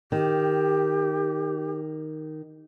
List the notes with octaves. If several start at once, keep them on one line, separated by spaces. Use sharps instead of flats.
D#3 G4